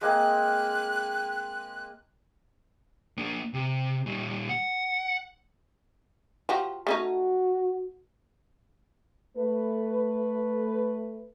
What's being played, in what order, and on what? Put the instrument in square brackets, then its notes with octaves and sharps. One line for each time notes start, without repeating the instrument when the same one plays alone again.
[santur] G#3 A#3 C4 [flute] F#6
[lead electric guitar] A#3 D4
C3
A#2 G3
F#5
[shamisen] F3 F#4 G4
[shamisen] A3 C#4 D#4 [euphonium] F#4
[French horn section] A3 B4